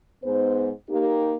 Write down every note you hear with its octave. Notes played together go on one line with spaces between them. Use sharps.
G#2 B3 C5
A#3 D#4 G4